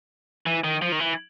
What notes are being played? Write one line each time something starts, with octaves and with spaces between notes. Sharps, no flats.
E3
D#3
F3
D#3
E3